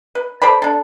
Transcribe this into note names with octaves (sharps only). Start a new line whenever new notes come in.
B4
A4 C5 D5 B5
D4 A4